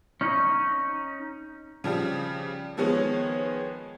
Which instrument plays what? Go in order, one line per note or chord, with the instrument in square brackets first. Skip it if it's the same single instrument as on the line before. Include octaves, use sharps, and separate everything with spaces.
[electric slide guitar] C#4 D#4
[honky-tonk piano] C#3 F3 G3
D#3 F3 G#3 B3 G#4 C#5